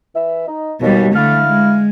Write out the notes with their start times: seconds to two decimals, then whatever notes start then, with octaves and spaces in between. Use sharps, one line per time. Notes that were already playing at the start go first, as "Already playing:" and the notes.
0.14 E3 E5
0.47 D#4
0.81 D#2 B2 G3
1.15 D3 A3 E4 F5 F6
1.45 G#3